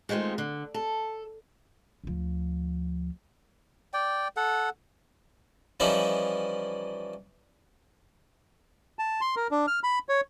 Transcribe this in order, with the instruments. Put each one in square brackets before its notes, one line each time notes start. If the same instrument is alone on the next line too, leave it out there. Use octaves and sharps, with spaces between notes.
[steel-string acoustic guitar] D#3 G#3 A3 C4 F4
D3
A4
[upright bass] D2 F3
[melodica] D5 G5
A4 F#5
[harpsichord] E3 F3 G3 C#4 D#4 E4
[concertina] A5
C6
A#4
D4
F6
B5
C#5